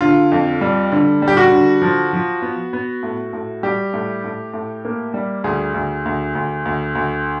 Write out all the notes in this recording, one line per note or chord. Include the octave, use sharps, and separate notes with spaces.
D3 F4
F2
G3
D3
G3
G4
F#4
D3
F3
F3
B3
B3
A2
A2
G3 G4
A2
A2
A2
A#3
G3
D2 G#4
D2
D2
D2
D2
D2